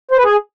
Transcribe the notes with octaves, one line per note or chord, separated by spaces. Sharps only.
C5
B4
G#4